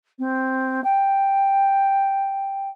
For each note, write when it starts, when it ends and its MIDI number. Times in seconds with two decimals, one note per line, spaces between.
0.19 0.81 60
0.84 2.69 79